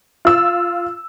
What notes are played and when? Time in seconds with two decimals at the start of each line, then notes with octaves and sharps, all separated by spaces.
0.25 F4 E6